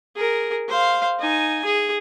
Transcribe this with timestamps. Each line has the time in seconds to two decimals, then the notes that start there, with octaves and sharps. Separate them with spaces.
0.16 G#4 A#4
0.68 C5 F5
1.19 D#4 G#5
1.65 G#4